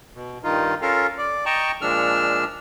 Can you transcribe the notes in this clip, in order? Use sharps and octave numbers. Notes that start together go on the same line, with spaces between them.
B2
G2 D#3 D#4 F4
C#4 F4 A4 A#4 F5
D5
D#5 G5 A5 A#5 C#6
A#2 F3 G#3 D4 E6 F6